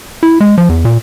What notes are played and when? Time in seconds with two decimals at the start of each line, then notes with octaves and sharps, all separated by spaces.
0.23 E4
0.40 G#3
0.58 F3
0.69 E2
0.85 A#2